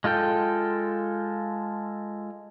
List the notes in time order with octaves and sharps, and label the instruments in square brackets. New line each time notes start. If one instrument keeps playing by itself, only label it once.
[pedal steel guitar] G#3 F4 A4 G5